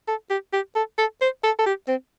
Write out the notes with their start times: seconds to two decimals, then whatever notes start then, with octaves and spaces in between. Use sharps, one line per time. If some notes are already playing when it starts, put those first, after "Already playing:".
0.08 A4
0.30 G4
0.53 G4
0.75 A4
0.98 A4
1.21 C5
1.44 A4
1.59 A4
1.66 G4
1.88 C4